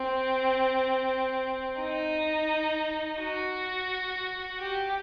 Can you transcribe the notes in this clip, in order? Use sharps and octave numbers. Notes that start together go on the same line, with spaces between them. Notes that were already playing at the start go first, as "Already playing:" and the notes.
Already playing: C4
D#4
F#4
G4